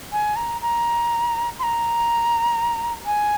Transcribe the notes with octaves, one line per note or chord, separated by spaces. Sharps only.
G#5
A#5
A#5
C6
A#5
G#5